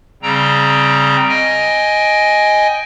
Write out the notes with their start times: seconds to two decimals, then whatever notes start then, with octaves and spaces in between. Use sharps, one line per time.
0.23 C#3 G3 C4 G5 A#5
1.29 D#5 G5 G#5